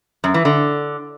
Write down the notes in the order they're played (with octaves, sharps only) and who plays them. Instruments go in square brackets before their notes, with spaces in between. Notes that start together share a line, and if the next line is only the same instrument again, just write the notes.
[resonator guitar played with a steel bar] F#2
E3
D3